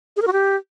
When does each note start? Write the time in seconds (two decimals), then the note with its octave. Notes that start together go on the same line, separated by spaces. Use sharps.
0.17 G#4
0.22 A#4
0.27 F#4
0.33 G4